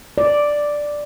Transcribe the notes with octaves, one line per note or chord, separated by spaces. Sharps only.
D5